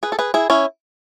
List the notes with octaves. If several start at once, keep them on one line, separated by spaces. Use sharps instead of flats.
G#4 B4
A4
G#4 B4
E4 G#4
C#4 E4